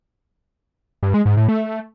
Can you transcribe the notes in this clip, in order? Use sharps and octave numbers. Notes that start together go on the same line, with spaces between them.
G2
G#3
G#2
A2
A3